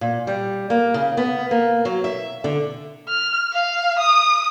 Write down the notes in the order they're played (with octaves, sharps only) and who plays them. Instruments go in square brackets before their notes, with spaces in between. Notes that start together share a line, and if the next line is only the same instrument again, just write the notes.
[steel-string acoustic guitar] A#2
G3
A#3
C#3
B3
A#3
F#3
E5
D3
[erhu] F6
F5
D#6